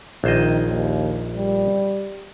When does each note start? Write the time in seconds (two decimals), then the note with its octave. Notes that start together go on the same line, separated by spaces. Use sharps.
0.24 A#1 D#3 C5 D#5
0.67 D#2
1.36 G3